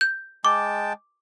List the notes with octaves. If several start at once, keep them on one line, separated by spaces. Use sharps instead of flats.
G6
G#3 G5 A5 D6